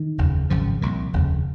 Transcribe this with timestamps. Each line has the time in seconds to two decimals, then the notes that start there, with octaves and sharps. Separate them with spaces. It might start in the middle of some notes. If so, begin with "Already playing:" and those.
Already playing: D#3
0.18 F1 D#2 C#3
0.50 G#1 F#2 C#3 F3
0.82 C2 A#2
1.13 F1 D#2 C#3